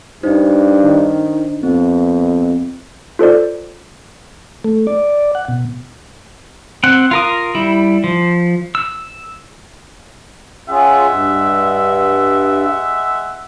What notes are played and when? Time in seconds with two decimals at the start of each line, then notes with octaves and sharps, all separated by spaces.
0.23 G2 D4 D#4 C5
0.83 D#3
1.63 F2 B3 C4
3.19 F4 A4 C5 D5
4.64 A3
4.87 D5
5.35 F#5
5.48 B2
6.84 C4 F#5
7.11 F4 A#4 D#6
7.55 G3 E4
8.04 F3
8.75 E6
10.69 G#3 C#4 F4 G#4 E5 F#5
11.08 G2